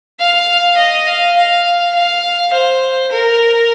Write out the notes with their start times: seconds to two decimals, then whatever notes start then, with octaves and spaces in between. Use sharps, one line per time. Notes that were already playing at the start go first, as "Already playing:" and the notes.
0.19 F5
0.77 D#5
1.07 F5
1.37 F5
1.95 F5
2.53 C5
3.12 A#4